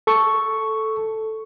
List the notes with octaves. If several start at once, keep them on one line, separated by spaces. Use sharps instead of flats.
A4 C#6